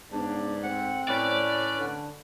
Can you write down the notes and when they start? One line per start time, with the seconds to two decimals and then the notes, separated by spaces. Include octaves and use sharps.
0.12 G#2 C#3 B3 D4
0.63 A3 C4 F#5
1.09 A2 C#4 B4 D5
1.77 D3